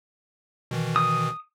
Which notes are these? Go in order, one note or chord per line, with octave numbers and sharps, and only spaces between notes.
B2 D#3 E3
D#6